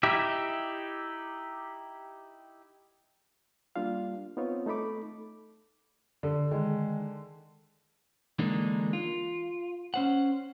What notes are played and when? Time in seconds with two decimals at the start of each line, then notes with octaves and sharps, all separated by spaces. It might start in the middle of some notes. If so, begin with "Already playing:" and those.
0.03 D#4 E4 G4 E5
3.76 G3 A#3 D4 F4 F5
4.37 B3 C4 D#4 F4 C#5
4.66 A3 D#4 A4 B5 D6
6.23 D3
6.51 D#3 G#3
8.39 D3 E3 G#3 A#3 D4 D#4
8.93 F4
9.94 C#4 C5 F#5